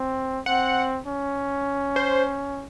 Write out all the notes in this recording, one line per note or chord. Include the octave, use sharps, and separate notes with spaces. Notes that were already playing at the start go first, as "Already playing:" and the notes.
Already playing: C4
C4 F#5
C#4
C5